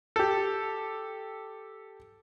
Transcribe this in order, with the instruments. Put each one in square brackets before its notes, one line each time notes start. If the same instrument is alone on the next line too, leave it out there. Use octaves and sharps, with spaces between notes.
[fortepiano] G4 A4